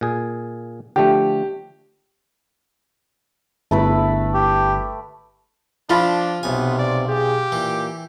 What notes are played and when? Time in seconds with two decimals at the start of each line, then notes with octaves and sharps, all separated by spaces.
0.01 A#2 G#4
0.96 D3 F3 A3 G4
3.71 G1 A3 E4 B4
4.34 G4
5.90 F3 D4 F4 B5
6.43 B1 C3 B3 G#5
6.79 D5
7.08 G4 G#4
7.52 A#2 E3